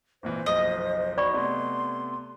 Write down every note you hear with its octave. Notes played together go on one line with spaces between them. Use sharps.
G#1 A#2 E3 C5
F#1 B1 F3 D#5
F#3 D#4 D5 B5 C#6
C3 A3 B3 D5 C6